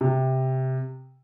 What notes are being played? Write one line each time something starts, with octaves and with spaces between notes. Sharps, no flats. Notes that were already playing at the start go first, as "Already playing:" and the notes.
C3